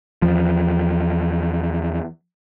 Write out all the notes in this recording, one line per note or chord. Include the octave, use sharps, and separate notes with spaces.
E2 F3